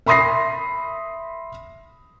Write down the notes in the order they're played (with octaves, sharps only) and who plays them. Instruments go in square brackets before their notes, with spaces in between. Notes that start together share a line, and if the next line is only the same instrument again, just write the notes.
[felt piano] E5 B5 C6 D#6 A#6 C7